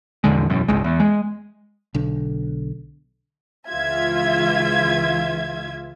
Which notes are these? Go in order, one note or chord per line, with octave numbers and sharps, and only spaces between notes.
A#1 E2 D3 G#3
E1 B1 F#2
G#1 C#2 G#3
E2
G#3
B1 D3
C#2 E3 F4 E5 G#6